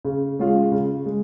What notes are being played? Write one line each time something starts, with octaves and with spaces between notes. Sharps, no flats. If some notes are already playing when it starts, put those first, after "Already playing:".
C#3
G#3 C#4 F4
C#3
G#3